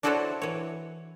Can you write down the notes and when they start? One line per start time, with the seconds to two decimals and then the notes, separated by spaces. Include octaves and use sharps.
0.03 D4 E4 F#4 A4 C5 C#5
0.42 E3 C#5